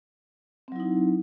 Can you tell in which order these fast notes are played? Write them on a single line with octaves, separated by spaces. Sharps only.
C4 F#3 E4 D#4